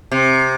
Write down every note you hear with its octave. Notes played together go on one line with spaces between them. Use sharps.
C3